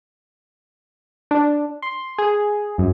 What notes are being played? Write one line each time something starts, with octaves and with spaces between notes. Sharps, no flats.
D4
C6
G#4
F#2